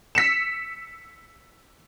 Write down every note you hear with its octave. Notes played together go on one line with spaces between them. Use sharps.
E6 B6 C#7 E7